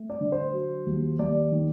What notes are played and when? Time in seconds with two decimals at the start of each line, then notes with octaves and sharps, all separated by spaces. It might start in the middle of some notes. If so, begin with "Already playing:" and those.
Already playing: A3
0.10 D5
0.21 D3
0.32 C5
0.53 F#3
0.86 D#2
1.19 D#2 D5
1.52 D#3